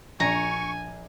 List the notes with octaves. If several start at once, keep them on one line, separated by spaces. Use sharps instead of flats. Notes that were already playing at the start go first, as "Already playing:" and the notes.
A#1 D4 G#5 A#5 C#6